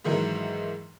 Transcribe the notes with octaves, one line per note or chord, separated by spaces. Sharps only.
G#2 D#3 E3 F#3